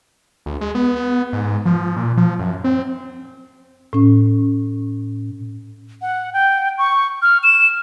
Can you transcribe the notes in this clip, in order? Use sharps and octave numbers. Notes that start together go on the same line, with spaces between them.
D2
G#3
B3
B3
G#2
F3
A#2
F3
F#2
C4
A2 C#4
F#5
G5
C#6
F6
E7